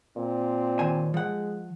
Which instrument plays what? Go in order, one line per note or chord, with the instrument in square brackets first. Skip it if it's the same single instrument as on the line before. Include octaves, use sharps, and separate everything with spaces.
[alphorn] A#2 [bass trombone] C4
[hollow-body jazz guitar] D#2 C5 G#5
[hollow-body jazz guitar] F3 F#5 [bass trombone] G#3